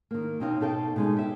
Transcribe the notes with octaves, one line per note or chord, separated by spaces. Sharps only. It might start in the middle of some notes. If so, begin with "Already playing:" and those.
D#3 A#3
B2 C4 D#4 C#5 F5
B2 D#4 A4 F5 G5
B2 G#3 D#4
D#4 G4 E5